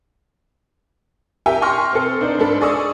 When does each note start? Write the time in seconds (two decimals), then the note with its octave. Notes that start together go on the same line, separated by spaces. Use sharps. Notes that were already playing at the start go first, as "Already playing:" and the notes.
1.46 G4 A#4 E5 G5 G#5
1.61 G5 G#5 C6 C#6 F6 A#6
1.93 C4 A4
2.21 D4 D#4 C5 D5
2.38 G#2 D4 A4 B5
2.61 G#4 D5 D#5 C#6 D#6 E6